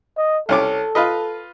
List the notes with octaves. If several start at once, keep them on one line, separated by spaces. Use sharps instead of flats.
D#5
C2 C#4 A4 D6
F4 B4 D#5